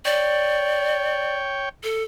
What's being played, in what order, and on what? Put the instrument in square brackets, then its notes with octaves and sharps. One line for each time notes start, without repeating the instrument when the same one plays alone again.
[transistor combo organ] C#5 G5 [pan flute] D5
[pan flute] A4